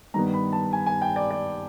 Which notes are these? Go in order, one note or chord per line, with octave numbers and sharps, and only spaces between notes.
G2 D#3 G3 B3 A#5
B5
A5
G#5
G#5
G5
D5
D5